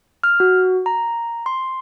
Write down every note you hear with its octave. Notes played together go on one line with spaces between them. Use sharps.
F6
F#4
A#5
C6